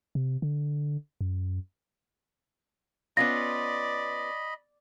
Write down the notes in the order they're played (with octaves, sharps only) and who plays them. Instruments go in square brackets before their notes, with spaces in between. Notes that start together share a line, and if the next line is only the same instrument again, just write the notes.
[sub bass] C3
D3
F#2
[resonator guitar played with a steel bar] B3 C#4 F4 [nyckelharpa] D5 [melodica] D#5 B5 [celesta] A#6